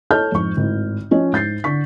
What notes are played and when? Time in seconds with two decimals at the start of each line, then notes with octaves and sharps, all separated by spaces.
0.10 A4 C#5 D#5 A5 F6 G6
0.32 F2 G#2 C#6
0.57 G#1 A2
1.11 F3 C#4 D#5
1.33 G#2 G6 A6 C7
1.64 D3 C#6 B6